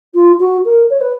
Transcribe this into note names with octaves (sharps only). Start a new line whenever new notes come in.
F4
F#4
A#4
C#5
B4